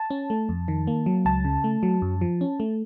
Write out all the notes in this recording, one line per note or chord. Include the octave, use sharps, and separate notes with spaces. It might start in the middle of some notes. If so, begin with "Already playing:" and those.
Already playing: A5
C#4
A3
F2
D#3
A#3
F#3
C#2 A5
C#3
A3
F#3
F#2
F3
C#4
A3